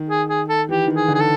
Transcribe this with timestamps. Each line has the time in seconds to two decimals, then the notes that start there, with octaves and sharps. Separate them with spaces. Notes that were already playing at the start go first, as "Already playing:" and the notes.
Already playing: D#3
0.09 G#4
0.28 G#4
0.49 A4
0.68 E3 G4
0.88 D#3
0.95 G#4
1.08 D3
1.14 G#4
1.21 A4